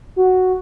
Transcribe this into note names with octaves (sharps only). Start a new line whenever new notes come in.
F#4